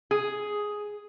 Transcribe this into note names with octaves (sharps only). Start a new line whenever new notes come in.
G#4